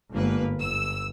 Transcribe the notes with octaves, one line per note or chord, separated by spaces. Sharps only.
G1 G#2 A#3 B4
G1 E6